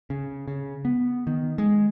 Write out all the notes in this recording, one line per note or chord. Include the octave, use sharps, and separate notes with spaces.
C#3
C#3
B3
D#3
G#3